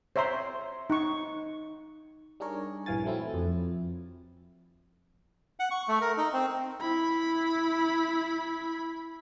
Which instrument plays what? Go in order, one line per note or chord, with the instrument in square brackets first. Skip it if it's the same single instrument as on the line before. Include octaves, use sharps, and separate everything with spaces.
[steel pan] C5 C#5 E5 A#5 C6
D#4 C#6
[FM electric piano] G3 D4 D#4 G#4 A#4 C#5
A#1 G2 E3 F5 G#5 A6
E3 F#3 A3 C4 E4
F2
[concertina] F#5
C#6
A3
A#4
D#4
C4
[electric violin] E4 B5